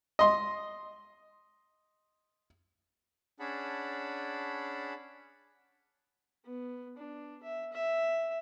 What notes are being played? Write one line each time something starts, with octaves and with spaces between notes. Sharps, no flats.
D#5 C6
C#4 D4 G#4 F#5 A5 B5
B3
D4
E5
E5